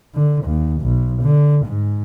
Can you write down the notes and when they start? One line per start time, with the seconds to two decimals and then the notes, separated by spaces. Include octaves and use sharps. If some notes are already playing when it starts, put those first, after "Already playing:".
0.14 D3
0.45 D#2
0.81 B1
1.22 D3
1.66 G#2